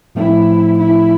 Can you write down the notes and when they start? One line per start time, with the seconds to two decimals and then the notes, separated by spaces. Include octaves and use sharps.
0.15 A2 F3 A3 C4 E4
0.78 E4